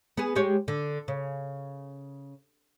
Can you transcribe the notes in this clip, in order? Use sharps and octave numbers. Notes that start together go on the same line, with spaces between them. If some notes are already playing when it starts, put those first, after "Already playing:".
B3 G#4
G#3 G4 C#5
D3
C#3